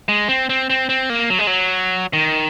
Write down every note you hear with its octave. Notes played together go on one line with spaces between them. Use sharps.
G#3
C4
C4
C4
C4
A#3
F#3
G#3
F#3
D#3